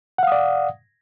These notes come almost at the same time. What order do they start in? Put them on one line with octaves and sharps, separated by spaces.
F#5 F5 D#6 D5